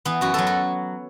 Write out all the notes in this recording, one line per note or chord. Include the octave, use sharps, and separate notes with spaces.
E3 B3
F#2 F#4
F#3 A4
F#4